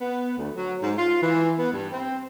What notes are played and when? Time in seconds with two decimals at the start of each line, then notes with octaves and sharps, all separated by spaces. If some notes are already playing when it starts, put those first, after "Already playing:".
0.01 B3
0.38 D2
0.55 F#3
0.82 G#2
0.97 F4
1.22 E3
1.59 B3
1.73 G2
1.92 C4